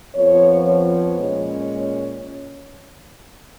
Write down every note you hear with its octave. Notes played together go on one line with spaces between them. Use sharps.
F2 F3 B3 C#5
C#5
A#2 G#3 C#4